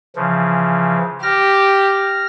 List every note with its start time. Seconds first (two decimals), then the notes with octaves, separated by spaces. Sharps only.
0.16 C#3 E3 F3
1.23 G4 F6 A#6